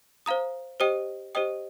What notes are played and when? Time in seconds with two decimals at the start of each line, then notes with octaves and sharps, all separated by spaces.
0.26 C5 F5 A#5 D#6
0.80 G4 C5 D#5 G5 D#6
1.35 G4 C5 D#5 G5 D#6